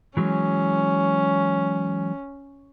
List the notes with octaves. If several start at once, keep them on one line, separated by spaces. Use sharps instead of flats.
E3 F#3 G#3 C#4